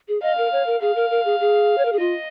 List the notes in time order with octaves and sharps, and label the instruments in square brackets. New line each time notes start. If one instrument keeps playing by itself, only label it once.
[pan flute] G#4
[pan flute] D#5 [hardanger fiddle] F5
[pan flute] A#4
C#5
A#4
[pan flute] G#4 [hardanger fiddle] F5
[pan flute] A#4
A#4
G#4
G#4
C#5
A#4
G#4
[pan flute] F4 [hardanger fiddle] D#5